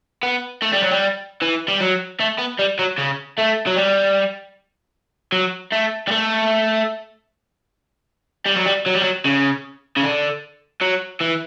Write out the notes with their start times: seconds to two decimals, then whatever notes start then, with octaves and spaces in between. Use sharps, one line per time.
0.23 B3
0.62 A3
0.73 G3
0.82 F#3
0.91 G3
1.42 E3
1.68 G3
1.81 F#3
2.20 A3
2.39 B3
2.59 G3
2.79 F#3
2.98 C#3
3.38 A3
3.67 F#3
3.76 G3
5.32 F#3
5.72 A3
6.07 G3
6.11 A3
8.46 G3
8.56 F#3
8.66 G3
8.86 F#3
8.94 G3
9.02 F#3
9.25 C#3
9.97 C#3
10.03 D3
10.82 F#3
11.21 E3